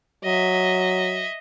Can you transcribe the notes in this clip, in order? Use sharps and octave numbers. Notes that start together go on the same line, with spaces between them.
F#3 D#5 E5